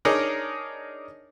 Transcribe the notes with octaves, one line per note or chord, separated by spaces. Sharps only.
D4 D#4 G#4 A#4 C#5 D5